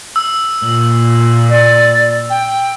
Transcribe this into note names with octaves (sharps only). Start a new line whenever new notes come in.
E6
A#2 F#7
D5
G5